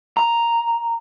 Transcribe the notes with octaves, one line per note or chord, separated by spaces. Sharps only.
A#5